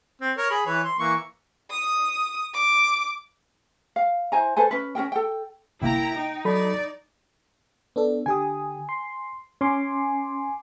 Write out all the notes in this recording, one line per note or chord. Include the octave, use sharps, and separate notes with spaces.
C4
A#4 C#5
G#4 B5
E3 B4 C#5
C6
E3 A#3 C#6
D#6
D6
F5
E4 C5 G#5 A#5
A4 B4 C5 G#5
C#4 B4
C#4 G#4 A#4 G5
A4 G5
G1 C2 A#3 E4 G5 A#5
D#4
F#3 A4 D5 B5
B3 D4 A4
D3 G4 G#5 D#6
C6
C#4 G#5 C6 D6